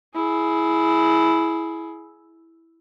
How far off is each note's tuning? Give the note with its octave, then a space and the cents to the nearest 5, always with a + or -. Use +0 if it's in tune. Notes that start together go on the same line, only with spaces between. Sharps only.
E4 +0 G#4 +20